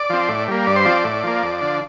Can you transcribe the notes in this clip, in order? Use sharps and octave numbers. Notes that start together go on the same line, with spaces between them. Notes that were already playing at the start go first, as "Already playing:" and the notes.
Already playing: D5
F3 C4
A2
G3 A#3
G2 D5
C5
F3 C4 D5
A2
F3 A#3
F2
D3 F3